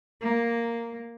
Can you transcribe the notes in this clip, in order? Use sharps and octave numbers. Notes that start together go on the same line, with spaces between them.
A#3